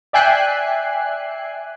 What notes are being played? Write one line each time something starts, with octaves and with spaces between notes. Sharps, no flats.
D5 E5 G5 G#5 F#6 C7